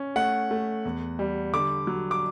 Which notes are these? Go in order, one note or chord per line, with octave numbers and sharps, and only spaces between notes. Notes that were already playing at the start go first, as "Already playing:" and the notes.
Already playing: C#4
A3 F#5
A3
E2
G3
D3 D6
F#3
D6